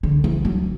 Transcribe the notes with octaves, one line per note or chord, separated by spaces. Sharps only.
D3
E3
F#3